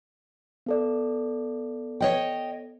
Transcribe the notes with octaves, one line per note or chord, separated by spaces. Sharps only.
B3 A4 D5
C#5 D#5 G5